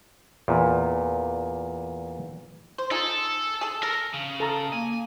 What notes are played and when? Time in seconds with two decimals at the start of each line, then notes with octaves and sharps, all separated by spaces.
0.48 E2 A#2
2.78 C5
2.91 D#4 F4 G#4 A4
3.61 G#4 A4
3.83 A4 A#4
4.14 C#3
4.40 A4 A5 A#5
4.73 A#3 G#5